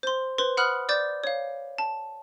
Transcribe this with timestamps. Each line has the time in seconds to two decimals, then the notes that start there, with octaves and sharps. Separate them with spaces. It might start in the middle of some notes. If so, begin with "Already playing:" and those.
0.03 C5 C6
0.38 B4 C5 C6
0.57 F#5 B5 D#6 F6 F#6 F#7
0.89 D5 D6 G6 A6
1.24 C#5 F5
1.78 A5